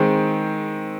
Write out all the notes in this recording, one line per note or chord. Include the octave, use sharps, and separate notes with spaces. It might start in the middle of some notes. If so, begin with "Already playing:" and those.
Already playing: D#3 G#3 C4